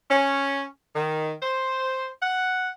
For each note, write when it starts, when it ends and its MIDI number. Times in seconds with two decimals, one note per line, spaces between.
0.11 0.65 61
0.96 1.32 51
1.42 2.08 72
2.22 2.71 78